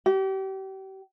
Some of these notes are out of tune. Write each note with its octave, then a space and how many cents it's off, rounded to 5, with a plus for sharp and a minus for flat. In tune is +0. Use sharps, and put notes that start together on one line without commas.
G4 -35